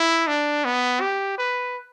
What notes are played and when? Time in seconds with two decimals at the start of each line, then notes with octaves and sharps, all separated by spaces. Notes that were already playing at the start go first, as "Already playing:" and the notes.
Already playing: E4
0.27 D4
0.65 B3
1.01 G4
1.38 B4